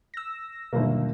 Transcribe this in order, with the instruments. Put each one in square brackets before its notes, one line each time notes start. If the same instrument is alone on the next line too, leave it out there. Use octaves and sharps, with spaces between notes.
[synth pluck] E6 A#6
[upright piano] G1 D#2 A#3 [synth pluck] B2 F#3